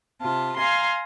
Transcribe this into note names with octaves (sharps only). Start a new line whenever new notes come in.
C3 F4 A5
F5 G#5 A#5 C6